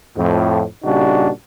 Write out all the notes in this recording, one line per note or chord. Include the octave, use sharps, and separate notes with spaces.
F2 A2
A#2 C#3 G3 D4 D#4 F#4